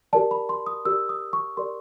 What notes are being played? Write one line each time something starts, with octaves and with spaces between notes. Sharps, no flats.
G4 A#4 D5 A5
B5
C6
D#6
G4 A#4 D5 E6
D#6
C#6
G4 A#4 D5 C6